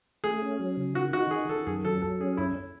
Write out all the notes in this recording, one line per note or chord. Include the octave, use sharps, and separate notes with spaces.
A3 G#4
C#4
F#3
C#3
D#3 F#4
D#4 F#4
D#3 G#4
D#3 A4
F#2 G#4
F#3 A4
F#3 A4
C#4 G#4
F#2 E4